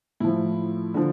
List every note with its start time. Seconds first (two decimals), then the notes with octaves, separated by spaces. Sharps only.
0.20 A2 F3 E4
0.94 D3 F3